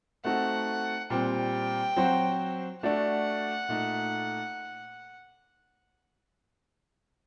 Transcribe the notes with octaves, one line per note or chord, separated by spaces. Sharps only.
A3 C4 D#4 F#4 A4 F#5
A#2 G3 C4 G5
F#3 C4 F#4 C5
A3 D4 F#4 A4 D5 F#5
A#2 A3 D#4